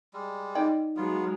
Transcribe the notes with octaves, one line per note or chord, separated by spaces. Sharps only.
G3 G#3
D#4 D5 D#5 G5
F#3 G#3 B3 F4